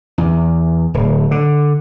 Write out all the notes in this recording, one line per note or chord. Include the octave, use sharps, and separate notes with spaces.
E2
D1
D3